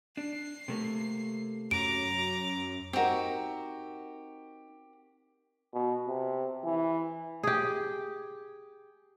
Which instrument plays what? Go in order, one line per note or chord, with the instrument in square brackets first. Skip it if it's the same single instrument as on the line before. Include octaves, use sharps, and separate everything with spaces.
[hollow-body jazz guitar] D4 [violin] C7
[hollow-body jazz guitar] C3 A3 A#3
[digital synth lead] F#2 [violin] A#5 D6 [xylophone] D7
[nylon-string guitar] C4 D#4 A#4 [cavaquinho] F#4 G4
[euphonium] B2
C3
E3
[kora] G4 G#4